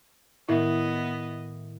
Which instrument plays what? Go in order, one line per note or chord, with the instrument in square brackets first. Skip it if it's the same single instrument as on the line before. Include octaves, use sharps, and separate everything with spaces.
[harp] A2 [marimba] D#3 A#4 E5 [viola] B3 D#5 [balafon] E4